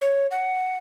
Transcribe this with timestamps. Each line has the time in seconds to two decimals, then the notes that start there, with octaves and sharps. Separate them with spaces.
0.01 C#5
0.31 F#5